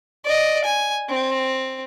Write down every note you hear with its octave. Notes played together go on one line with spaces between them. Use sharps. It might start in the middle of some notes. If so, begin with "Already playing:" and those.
D5 D#5
G#5
C4